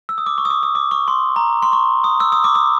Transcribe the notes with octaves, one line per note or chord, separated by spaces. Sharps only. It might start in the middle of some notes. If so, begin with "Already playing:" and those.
E6
D#6
D6
C#6
D#6
D6
D#6
D6
C#6
C6
A#5
C6
C#6
D#6
E6
D#6
D6
D#6